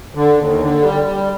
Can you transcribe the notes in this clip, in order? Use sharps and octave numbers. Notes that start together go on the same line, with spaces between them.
D3
D#2
D3
G3
G3